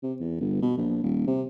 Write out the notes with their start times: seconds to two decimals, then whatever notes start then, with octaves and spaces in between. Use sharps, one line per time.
0.03 C3
0.20 E2
0.40 G1
0.62 B2
0.77 A#1
1.03 D#1
1.27 C3